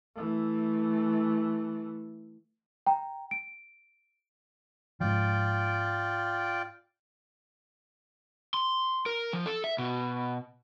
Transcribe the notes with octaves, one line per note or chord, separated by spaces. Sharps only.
E3 A3
G5 A#5
D7
G#2 F3 F4 D5 G5
C6
A#4
F3
A4
E5
B2